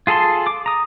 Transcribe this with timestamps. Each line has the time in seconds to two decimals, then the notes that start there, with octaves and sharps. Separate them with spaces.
0.07 F4 G#4 A4 A5 C6
0.47 D6
0.66 A#5 D#6